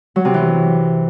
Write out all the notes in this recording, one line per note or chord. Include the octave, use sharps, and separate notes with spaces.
F#3
C3
E3